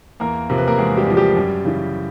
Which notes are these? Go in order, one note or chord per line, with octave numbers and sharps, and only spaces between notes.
E2 A#3 A#4
C3 F3 A#4
B4
A#3 A#4
E2 G#3 G#4
G3 G4
C3 F3
G3 G4
F#2
C#3 E3